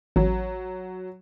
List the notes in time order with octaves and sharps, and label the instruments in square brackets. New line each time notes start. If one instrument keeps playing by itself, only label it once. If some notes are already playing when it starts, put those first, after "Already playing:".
[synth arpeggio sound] A1 [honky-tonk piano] F#3